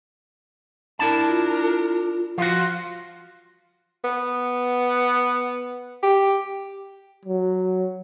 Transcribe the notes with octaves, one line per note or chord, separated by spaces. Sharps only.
D4 E4 A#4 A5
F4
F3 F4 F#4
B3
G4
F#3